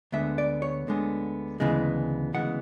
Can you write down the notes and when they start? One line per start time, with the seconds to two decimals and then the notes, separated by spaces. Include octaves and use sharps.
0.12 D2 D3 G#3 B3 E5
0.38 D5
0.62 C#5
0.87 D2 D3 G#3 B3
1.60 D2 C#3 E3 G#3 B3
2.33 D2 C#3 E3 G#3 B3 F#5